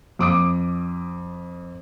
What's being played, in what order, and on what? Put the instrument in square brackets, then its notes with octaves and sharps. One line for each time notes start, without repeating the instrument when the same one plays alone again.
[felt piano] F2 D6 D#6 D7